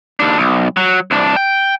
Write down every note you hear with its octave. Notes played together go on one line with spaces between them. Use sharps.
D#2 D4
B1
F#3
C2 D4
G5